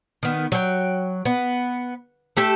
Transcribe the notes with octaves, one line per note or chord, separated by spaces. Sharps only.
D#3 B3
F#3 G5
B3
A3 G4 A4